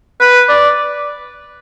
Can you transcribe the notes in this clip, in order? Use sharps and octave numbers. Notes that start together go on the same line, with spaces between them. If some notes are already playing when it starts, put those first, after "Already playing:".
B4
D5